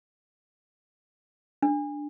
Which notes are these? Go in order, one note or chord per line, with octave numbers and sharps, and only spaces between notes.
D4